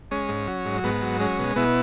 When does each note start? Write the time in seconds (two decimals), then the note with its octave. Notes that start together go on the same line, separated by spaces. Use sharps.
0.11 G#3 C#4
0.29 G#2
0.48 F#3
0.65 G#2
0.84 G#2 B3
1.02 F#3
1.20 G#3 C#4
1.39 B2
1.56 B2 B3 E4